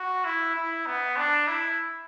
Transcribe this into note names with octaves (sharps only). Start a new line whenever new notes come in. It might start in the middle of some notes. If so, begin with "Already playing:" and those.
Already playing: F#4
E4
E4
B3
D4
E4